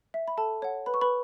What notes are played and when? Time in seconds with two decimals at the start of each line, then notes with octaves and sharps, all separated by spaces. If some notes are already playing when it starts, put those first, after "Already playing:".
0.14 E5
0.28 B5
0.38 A4 A5
0.62 C#5 F#5
0.86 B4 B5
0.94 C#6
1.01 B4 B5